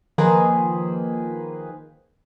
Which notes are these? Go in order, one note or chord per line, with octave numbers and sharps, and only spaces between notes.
D#3 F3 A#3 G#4 B4 C5